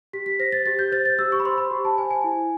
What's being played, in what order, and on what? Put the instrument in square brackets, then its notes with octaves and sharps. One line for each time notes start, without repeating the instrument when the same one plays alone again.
[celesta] G4 B6
B6
C5 A#6
A6
G4 A6
G6
C5 A6
A6
G4 E6
C#6
B5
C5 C6
B5
G4
A5
C5 G#5
G#5
E4